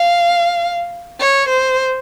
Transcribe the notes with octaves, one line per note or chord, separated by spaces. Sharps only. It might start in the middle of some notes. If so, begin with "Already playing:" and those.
Already playing: F5
C#5
C5